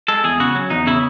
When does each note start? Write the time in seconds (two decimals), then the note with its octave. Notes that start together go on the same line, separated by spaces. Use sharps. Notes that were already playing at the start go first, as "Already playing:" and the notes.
0.08 G#3 A4
0.24 E2 G#4
0.40 C#3 F#4
0.55 F#3
0.70 E2 D#4
0.87 C#3 E4